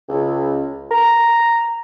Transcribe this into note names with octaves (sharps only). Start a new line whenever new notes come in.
C#2
A#5